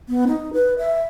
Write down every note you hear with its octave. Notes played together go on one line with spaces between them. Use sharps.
B3
D#4
B4
E5